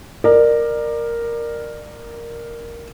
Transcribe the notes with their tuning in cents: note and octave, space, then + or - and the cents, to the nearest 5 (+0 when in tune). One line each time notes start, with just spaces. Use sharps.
A#4 +0 D5 +25